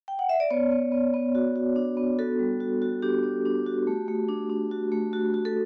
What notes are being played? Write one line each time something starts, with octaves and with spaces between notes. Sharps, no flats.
G5
F#5
E5
D5
B3 C#5
B3
B3
B3
F#4
F#4
D4
B3
F#4 A4
G3
F#4
F#4
D4 G4
D4
D4
F#4
A3
A3
D4
D4
F#4
A3
F#4
F#4
A4